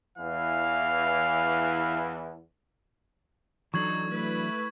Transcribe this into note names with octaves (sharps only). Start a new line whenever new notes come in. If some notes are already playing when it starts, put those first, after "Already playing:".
E2 E3 F5
E3 F#3 D4 D#4 A4 C#6 G#6 F#7
A3 E4 B4